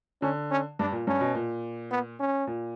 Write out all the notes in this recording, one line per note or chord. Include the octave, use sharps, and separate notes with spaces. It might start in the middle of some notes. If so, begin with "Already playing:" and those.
D3 C#4
C#4
G2 D4
A#2
G2 C#4
B2
A#2
B3
C#4
A#2